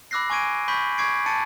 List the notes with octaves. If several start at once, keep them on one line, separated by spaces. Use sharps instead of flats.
B5 D6 E6 F#6 A#6 C7
G#5 C#6 D6 G#6 D7 D#7
B5 C#6 G6 B6 F#7
C#6 D6 G#6 C7 D7
A5 A6 C#7 D#7